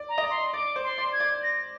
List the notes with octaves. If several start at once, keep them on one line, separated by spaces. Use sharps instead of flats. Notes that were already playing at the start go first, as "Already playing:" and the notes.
Already playing: D5
A#5
D#5
D5
C6
D5 D6
C5
C6
D5
G#6
D5
A#6